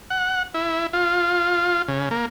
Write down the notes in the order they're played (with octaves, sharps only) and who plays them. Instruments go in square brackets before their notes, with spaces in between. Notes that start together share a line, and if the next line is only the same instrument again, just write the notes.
[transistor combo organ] F#5
E4
F4
C#3
A#3